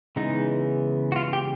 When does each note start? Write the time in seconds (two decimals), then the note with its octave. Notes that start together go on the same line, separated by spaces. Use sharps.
0.16 C#3 E3 G#3 B3 D#4
1.12 F#4
1.16 F4
1.33 G4